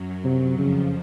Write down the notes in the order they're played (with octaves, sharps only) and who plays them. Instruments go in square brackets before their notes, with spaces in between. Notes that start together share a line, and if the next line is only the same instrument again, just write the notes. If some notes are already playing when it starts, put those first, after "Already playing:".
Already playing: [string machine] F#2 F#3
[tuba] C3
[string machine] F2 F3 [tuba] C#3